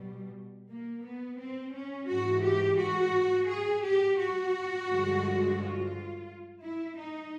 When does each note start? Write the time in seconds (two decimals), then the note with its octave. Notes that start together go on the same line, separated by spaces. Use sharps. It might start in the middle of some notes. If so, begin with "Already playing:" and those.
Already playing: B2 G3
0.70 A#3
1.04 B3
1.39 C4
1.74 C#4
2.08 G#2 E3 G#3 F#4
2.43 G4
2.78 F#4
3.48 G#4
3.82 G4
4.18 F#4
4.87 G2 D3 F3 G#3
5.57 F4
6.61 E4
6.96 D#4